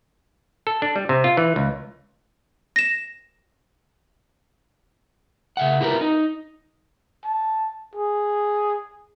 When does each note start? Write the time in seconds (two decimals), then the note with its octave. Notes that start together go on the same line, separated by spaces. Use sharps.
0.67 A4
0.82 D4
0.96 G3
1.09 C3
1.24 F4
1.37 E3
1.56 C#2
2.76 A#6 E7
5.57 C#3 E5 F#5
5.81 E4 G4 A#4 B4
6.01 D#4
7.24 A5
7.95 G#4